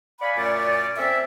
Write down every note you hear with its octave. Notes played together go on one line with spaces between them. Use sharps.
D5 F5 F#5 G#5 B5
F#2 A#2 A3 C#4 C#5 D5
C4 C#4 A4 E5